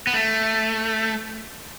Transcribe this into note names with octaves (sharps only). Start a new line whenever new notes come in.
B3
A3